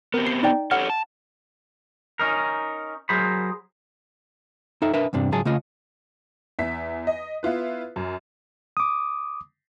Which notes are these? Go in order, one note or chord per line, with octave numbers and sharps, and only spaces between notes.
B3 C4 G4 A#4
C7
D#4 D5 G5
G4 A4 C#5 F#5 F6
A5
C#4 D#4 A#4
F#3 G#4 A#4 C5 B5
D#4 A4 E5
D4 A#4 B4 E5
E2 G2 C3 D4
C#2 G#2 F#3 G#4 A5
C#3 A3 F4 D#5
E2 E5 B6
D#5
B3 E4 F4 B4
F#2
D6 D#6